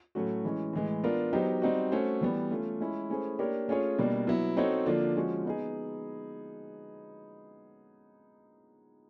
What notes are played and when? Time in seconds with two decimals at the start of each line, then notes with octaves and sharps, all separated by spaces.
0.15 A2 F#3 A3 C#4 F#4
0.44 E3 G#3 C#4
0.73 A2 E3 G#3
1.04 B3 D4 F4 A#4
1.33 F#3 B3 D#4 G4 C5
1.62 G3 C4 D#4 F#4
1.92 A3 C#4 F#4 A4 C5
2.21 E3 G3 B3
2.51 A3 C#4 F4
2.80 G#3 C#4 E4
3.10 A3 C#4 E4 G#4 C5
3.39 A#3 D4 G4 A#4 C#5
3.68 A3 C#4 F4 G#4 C#5
3.98 B2 G3 A#3 D4
4.27 F#3 B3 E4
4.57 C4 D#4 F#4 A4 C#5
4.86 D3 F3 A#3 D4 F4
5.16 F3 G#3 C#4 F#4
5.45 B3 D#4 G#4